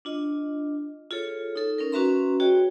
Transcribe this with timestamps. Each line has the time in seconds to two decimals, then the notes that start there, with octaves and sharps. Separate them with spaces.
0.05 D4 F4 D#5
1.11 F4 G#4 A4 C#5
1.56 D#4 A4
1.78 C#4 D#4 A#4
1.92 C#4 F#4 B4 E5 A#5 C6
2.40 F#4 G#4 C#5 D#5 G5